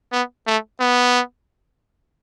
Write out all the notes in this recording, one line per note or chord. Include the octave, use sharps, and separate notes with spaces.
B3
A3
B3